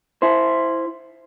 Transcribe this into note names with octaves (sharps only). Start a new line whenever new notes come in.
E4 C5